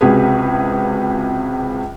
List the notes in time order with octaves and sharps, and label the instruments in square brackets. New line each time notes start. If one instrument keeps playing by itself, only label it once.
[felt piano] C#2 C3 F#4 G#4 B4